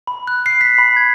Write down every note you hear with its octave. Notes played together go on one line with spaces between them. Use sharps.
B5
F#6
C7
B6
B5
G#6